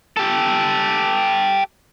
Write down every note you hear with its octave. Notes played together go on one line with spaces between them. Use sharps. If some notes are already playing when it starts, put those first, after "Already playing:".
G4 A4